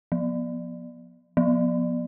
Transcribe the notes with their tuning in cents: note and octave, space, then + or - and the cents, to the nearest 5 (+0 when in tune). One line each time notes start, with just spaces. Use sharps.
F3 +10
F3 +15